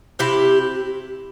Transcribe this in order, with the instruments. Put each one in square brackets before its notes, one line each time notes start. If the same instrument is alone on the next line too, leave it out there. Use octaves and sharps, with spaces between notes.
[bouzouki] C3 E4 G4